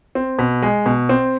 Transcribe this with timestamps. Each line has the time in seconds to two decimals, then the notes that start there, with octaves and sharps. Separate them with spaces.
0.15 C4
0.39 B2
0.63 G#3
0.86 B2
1.09 C4